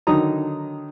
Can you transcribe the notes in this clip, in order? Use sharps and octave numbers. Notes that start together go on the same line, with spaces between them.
D3 D#3 F#3 D#4 A#5 D#6